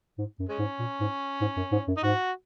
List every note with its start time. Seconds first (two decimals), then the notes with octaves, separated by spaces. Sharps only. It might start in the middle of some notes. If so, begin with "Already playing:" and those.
0.18 G#2
0.39 F#2
0.49 G#3 C#4
0.59 G#2
0.79 A#2
1.00 G#2
1.41 G#2
1.56 F#2
1.72 G#2
1.88 F#2
1.97 D#4
2.03 G#2 F#4